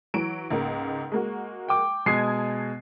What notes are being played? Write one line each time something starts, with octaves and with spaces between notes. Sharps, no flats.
E3 F#3 D7
C#2 G#2 A#3
G#3 A#3 F#4
G5 D6
B2 G#3 A5 D#6 G#6 C7